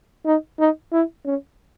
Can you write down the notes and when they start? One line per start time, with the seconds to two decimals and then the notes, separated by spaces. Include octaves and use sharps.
0.26 D#4
0.59 D#4
0.92 E4
1.26 C#4